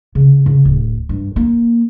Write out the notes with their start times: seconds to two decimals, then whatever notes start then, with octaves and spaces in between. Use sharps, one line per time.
0.15 C#3
0.46 C#3
0.65 D1
1.09 G2
1.36 A#3